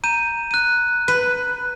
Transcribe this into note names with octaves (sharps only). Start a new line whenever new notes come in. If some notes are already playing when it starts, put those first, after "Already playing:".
A#5 G6 D#7
F#6 D#7
B4